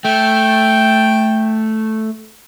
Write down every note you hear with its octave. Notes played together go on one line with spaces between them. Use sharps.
A3 G5